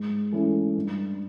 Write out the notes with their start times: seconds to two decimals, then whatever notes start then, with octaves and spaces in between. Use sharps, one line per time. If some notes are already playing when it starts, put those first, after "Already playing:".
Already playing: G#2
0.32 E3 A3 C#4
0.76 G2